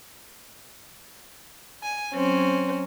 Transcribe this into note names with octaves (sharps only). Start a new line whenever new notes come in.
G#5
F#3 C4 C#4